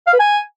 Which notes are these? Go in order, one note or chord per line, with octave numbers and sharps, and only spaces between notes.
F5
B4
G#5